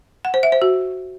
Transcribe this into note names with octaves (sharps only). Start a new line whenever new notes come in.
F#5
C5
E5
C5
F#4